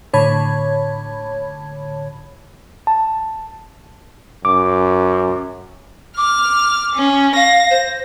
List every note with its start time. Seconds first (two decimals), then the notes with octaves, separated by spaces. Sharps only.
0.13 A2 D3 C#5 A5 B5 G#6
2.87 A5
4.45 F#2 D6
6.17 D6 F6
6.95 C#4
7.36 F5 A#6
7.70 C5